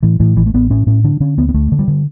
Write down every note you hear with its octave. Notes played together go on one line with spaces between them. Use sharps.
A2 E3
A2 E3
A1 E3
A3
A1 B3
A2 C#4
A2 C#4
D3 D4
D3 C#4
D2 B3
B3
D2 A3
D3
G3
D3